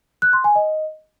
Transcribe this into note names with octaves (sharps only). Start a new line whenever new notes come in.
F#6
C6
G#5
D#5